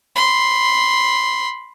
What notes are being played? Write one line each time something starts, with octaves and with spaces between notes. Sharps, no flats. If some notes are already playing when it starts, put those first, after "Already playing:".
B5 C6